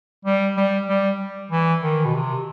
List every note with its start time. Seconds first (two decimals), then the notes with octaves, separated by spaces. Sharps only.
0.25 G3
0.56 G3
0.88 G3
1.51 E3
1.82 D#3
2.05 B2
2.14 C3